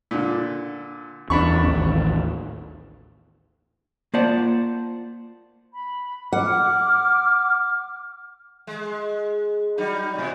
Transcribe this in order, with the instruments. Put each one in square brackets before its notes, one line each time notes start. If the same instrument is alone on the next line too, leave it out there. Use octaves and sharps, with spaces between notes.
[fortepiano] A#2 D3
[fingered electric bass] E2 C#4 [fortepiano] D4 B5 C#6
[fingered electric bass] A1 D#2
[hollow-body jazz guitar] A#3 F4 C5 D5 F#5 A5
[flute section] B5
[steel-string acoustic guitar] F#5 [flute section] D6 F6
[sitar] G#3
F#3 G3 D#4
A2 C3